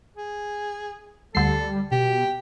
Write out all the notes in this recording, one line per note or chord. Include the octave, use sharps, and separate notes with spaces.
G#4
D2 G3 A4 C7
B2 G4